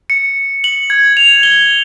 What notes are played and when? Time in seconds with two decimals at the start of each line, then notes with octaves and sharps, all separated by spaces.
0.10 C#7
0.64 F#7
0.90 G#6
1.17 F7
1.43 G7